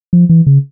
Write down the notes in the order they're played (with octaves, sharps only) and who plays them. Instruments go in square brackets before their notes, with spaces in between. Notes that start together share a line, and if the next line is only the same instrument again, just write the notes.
[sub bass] F3
E3
C#3